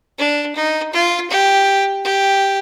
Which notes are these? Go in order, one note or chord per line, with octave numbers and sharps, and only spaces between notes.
D4
D#4
F4
G4
G4